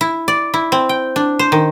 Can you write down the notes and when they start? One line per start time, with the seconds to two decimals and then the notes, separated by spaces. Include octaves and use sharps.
0.01 E4
0.28 D5
0.54 E4
0.72 C4
0.89 G5
1.16 D4
1.39 C5
1.52 D#3